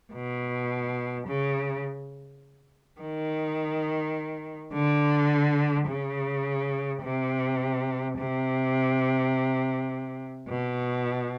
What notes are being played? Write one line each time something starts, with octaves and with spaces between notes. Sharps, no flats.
B2
C#3
D#3
D3
C#3
C3
C3
B2